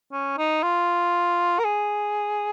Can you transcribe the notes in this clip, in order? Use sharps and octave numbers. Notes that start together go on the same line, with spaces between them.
C#4
D#4
F4
A#4
G#4